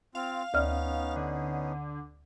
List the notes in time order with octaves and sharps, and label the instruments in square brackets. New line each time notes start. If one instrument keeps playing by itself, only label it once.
[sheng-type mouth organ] C4 F4 [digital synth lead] F5
[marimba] D2 D5 F6 [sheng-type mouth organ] B3 C#4 D#4
[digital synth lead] D3